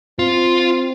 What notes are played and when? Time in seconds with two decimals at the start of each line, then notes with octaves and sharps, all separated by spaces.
0.19 C4 F4